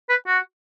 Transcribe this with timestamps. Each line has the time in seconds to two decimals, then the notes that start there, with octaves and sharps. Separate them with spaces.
0.09 B4
0.27 F#4